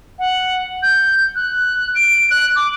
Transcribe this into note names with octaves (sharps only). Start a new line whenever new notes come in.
F#5
G6
F#6
D7
F#6
D6